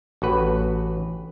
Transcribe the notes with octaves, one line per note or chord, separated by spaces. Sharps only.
A1 F#4 B4